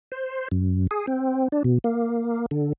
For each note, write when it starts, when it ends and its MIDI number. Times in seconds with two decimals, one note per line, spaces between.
0.12 0.48 72
0.51 0.87 42
0.91 1.06 68
1.07 1.48 60
1.52 1.63 62
1.64 1.79 47
1.84 2.46 58
2.51 2.73 50